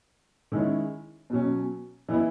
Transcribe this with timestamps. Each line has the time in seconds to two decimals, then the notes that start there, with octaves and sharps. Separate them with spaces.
0.52 D#3 G#3 C#4 E4
1.30 B2 F#3 C#4
2.09 E3 B3 E4